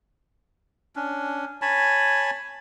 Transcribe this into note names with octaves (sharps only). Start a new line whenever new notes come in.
C#4 D4
C#5 G#5 A5 B5